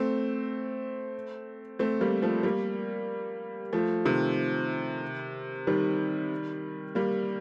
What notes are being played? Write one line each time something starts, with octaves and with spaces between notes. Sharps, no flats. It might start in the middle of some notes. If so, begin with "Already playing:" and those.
Already playing: A3 C4
A3 C4
G3 A#3
F3 A3
G3 A#3
F3 A3
C3 D#3
D#3 G3
G3 A#3